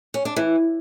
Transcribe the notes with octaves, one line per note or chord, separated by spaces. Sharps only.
C#4
D4
E3